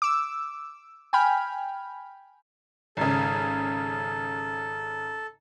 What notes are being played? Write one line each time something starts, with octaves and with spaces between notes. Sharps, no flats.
D6 E6
G5 G#5 B5 F6
G#1 C#3 A4